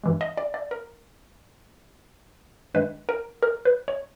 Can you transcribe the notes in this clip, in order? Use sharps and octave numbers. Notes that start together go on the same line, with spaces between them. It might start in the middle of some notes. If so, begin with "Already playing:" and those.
G2 E3 G#3
D#5
D5
D5
A#4
G2 D#3 G#3 B4
A#4
A#4
B4
C#5